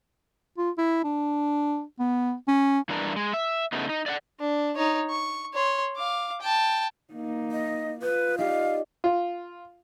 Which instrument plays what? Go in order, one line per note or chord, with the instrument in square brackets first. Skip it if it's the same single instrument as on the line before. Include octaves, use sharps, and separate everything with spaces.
[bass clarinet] F4
E4
D4
B3
C#4
[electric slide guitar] G2 E3 D4 A#4
G#3
E5
C#3 A3 B3 D#4
D#4
D5 E5 F#5
[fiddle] D4
D#4 C#5
C#6
C#5 C6
F5 D6
G5 A5
[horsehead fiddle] A#3 D#4
[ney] D#5
[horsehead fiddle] F4 [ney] B4 [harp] D#6 G6
[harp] D#4 G4 D5 [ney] F5
[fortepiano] F4